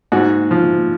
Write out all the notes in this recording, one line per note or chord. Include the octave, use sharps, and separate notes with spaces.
G#2 F#4
F3